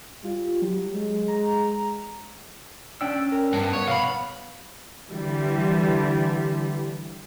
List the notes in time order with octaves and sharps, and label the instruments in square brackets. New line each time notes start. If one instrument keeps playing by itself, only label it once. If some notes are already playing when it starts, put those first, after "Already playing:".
[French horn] G3 [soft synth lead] F4
[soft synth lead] F#3
[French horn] G#3
[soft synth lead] A#5
[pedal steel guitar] C#4 G5 E6 [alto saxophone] D4
[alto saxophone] A#4
[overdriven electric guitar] G2 [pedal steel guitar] B3 B4
[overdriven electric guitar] C#5
[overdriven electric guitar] B1 B5 [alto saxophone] F5
[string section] D3 E3 G3